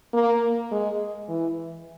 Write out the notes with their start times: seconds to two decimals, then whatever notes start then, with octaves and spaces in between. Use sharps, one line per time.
0.14 A#3
0.72 G#3
1.29 E3